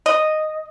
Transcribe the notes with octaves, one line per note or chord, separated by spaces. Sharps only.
D#5